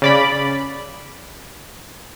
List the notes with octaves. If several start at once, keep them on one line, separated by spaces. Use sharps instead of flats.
C#3 D5 B5